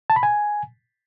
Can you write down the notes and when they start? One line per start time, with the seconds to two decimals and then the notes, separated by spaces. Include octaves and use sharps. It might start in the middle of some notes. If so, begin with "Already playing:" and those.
0.10 A5
0.16 B5
0.23 G#5